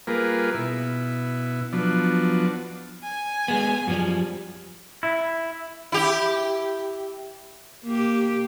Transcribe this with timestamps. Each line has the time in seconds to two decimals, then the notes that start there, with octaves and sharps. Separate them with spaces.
0.07 G3 A#3 F4 G#4 A#4 B4
0.54 B2 E4
1.73 F3 F#3 B3 D4
3.04 G#5
3.48 G#3 B3
3.87 F#2 F3 G3
5.03 E4
5.92 E4 G4
7.84 A#3 G4